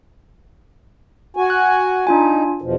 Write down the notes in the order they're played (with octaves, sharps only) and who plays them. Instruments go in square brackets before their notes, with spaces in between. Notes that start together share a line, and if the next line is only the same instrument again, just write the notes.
[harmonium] F#4 G#5
[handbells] F#6
[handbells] D4 F4 G#5 [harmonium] D#4
[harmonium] E2 B2 F3